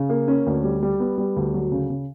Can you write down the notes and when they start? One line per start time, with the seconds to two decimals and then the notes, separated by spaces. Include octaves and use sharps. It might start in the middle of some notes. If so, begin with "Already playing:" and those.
Already playing: C#3
0.09 A#3
0.28 C#4
0.47 D2
0.64 G3
0.82 G3
1.00 B3
1.18 G3
1.36 D2
1.54 F#3
1.72 C#3
1.90 C#3